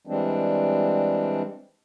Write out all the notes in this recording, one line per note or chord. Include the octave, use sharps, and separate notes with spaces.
E3 G3 G#3 C4 D4